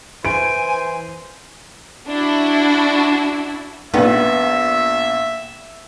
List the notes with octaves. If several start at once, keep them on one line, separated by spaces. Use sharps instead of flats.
E3 C5 G#5 D7
D4 E4 F#4
A#1 A#2 B3 E5